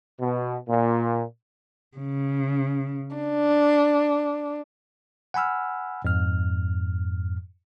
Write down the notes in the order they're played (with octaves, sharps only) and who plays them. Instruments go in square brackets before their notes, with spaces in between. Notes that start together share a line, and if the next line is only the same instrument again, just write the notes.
[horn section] B2
A#2
[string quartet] C#3
D4
[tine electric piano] F#5 G#5 B5 E6 F6
F2 G#2 F6